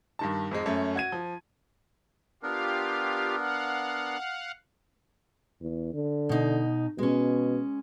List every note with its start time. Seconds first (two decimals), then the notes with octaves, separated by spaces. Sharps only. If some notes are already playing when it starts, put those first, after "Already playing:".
0.19 G2 D#3 A5
0.51 F2 G#2 G#3
0.66 F#2 A3 C#4
0.96 F#4 G#6 D#7
1.12 F3
2.43 B3 D4 F4 G4 A#4 F5
3.37 F5 F#5
5.61 E2
5.94 D3
6.29 B2 D#4
6.98 B2 G#3 C#4